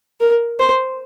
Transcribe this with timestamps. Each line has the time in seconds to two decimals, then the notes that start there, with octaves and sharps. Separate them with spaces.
0.20 A#4
0.59 C5